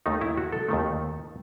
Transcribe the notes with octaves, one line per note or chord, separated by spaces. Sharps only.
D#2 D#3 A3 D#4
E4
F#4
A4
D#2 D#3 A3